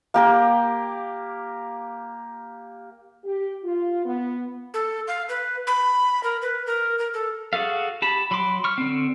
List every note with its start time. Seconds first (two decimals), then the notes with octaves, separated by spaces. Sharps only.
0.14 A#3 G4 A#4
3.24 G4
3.63 F4
4.04 B3
4.74 A4
5.08 F5
5.29 B4
5.67 B5
6.23 A#4
6.42 B4
6.66 A#4
6.99 A#4
7.14 A4
7.53 F#4 G#4 A4 F5
8.02 G4 A5 B5
8.31 F#3 B5 C6 D6
8.64 C#6 F6
8.78 D3 C4